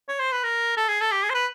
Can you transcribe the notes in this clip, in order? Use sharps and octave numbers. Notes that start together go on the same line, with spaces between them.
C#5
C5
B4
A#4
A4
G#4
A4
G4
G#4
C5
B4